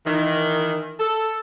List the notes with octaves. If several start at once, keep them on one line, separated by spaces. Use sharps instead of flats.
D#3 E3
A4